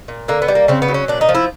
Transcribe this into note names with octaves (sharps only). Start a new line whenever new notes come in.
A#2
D3 A#3
B3
G3
A#3
C#3 C4
B3
F#3
C#4
A#2 D4
D#4
F3
E4